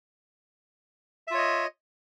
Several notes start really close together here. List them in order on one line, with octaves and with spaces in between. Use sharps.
E5 F4 C#5 D#5